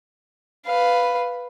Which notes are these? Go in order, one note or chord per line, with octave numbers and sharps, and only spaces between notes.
B4 F5